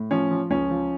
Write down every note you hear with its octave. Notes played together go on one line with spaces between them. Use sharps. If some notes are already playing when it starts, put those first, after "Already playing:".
Already playing: A2
F3 C#4
F3
C#2 C#4
F3